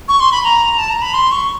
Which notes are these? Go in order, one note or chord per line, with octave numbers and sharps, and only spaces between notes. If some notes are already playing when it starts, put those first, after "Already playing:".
C#6
C6
B5
A#5
A5
A#5
B5
C6
C#6